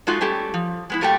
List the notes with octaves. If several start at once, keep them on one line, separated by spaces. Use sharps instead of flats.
G#3 A3 D#4 F4 F#4
G3 A3 C#4 G4 A4
F3
G#3 B3 E4
A#2 G3 A3 F#4 G5